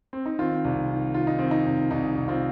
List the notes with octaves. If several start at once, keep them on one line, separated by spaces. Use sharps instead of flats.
C4
D#4
D#3 C4 F4
C2
D#3
D#3 F4
D#4
D#3 C4
D#4
C2
C2 D#4
C2
C4 F4